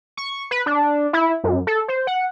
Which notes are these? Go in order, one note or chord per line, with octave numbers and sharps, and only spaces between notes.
C#6
B4
D4
E4
F#2
A4
C5
F#5